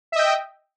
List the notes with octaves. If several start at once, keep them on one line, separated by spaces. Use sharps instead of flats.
D#5 E5 G5